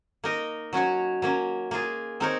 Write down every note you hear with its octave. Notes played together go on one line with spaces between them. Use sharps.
A#3 D#4 A#4 D#5
F#3 C#4 F#4 C#5
F#3 A#3 C#4
A#3 F4 G#4
C4 D#4 A#4 C#5